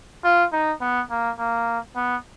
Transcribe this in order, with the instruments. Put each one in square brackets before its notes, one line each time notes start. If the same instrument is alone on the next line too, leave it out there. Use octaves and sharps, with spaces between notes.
[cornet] F4
D#4
B3
A#3
A#3
B3